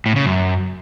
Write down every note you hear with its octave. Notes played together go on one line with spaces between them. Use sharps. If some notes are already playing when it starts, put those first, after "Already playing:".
A2
C#3
F#2